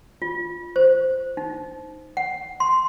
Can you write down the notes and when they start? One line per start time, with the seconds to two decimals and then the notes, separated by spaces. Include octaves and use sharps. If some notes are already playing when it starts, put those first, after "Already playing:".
0.22 F4
0.76 C5
1.37 D#4
2.17 F#5
2.60 C6